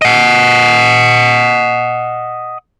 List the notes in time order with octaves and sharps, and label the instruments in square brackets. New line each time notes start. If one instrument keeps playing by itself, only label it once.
[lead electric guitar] D#5 F#5